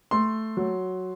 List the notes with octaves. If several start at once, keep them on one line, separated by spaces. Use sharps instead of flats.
A3 C6
F#3